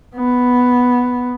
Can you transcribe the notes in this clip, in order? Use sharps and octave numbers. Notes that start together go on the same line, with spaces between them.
B3